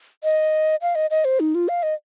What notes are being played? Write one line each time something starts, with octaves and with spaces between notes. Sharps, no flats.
D#5
F5
D#5
D#5
C5
D#4
F4
F5
D#5